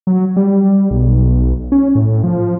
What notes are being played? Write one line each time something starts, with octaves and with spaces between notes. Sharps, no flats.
F#3
G3
B1
C#4
A2
F3